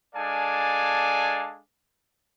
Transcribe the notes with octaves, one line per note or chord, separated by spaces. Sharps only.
G#3 D4 A4 D5 F5 G#5